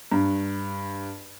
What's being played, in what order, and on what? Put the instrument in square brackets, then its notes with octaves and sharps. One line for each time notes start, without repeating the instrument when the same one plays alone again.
[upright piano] G2